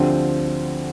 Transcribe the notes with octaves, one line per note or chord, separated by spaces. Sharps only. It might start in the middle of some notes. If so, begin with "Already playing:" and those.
Already playing: D2 D3 F3 C4 G4